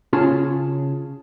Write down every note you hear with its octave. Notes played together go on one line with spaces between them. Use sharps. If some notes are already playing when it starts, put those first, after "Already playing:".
C#3 C#4 F4 G#4 A5